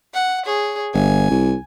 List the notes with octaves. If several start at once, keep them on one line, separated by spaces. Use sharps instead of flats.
F#5
G#4 C#5
G1 G#5
C2